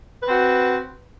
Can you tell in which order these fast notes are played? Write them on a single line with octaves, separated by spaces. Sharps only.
B4 C4 F#4